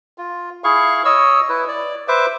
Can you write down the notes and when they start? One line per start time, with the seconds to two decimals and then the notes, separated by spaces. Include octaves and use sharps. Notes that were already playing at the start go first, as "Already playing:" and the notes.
0.18 F4
0.64 E4 G#4 F5 C#6
1.05 C#5 D#5 E6
1.49 E4 B4
1.68 D5
2.08 B4 C5 E5 D6